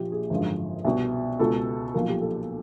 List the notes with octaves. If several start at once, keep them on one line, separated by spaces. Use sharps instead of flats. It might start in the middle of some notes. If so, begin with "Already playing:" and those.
Already playing: A#1 A#2 F3 G4
G#4
G#1 F#2 D3 F3
C2 B2
C#2 B2 A4
B1 A#2 F3 A#4
G4
A4